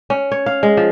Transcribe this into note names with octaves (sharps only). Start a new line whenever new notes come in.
C#4
C#5
F5
G#3
F3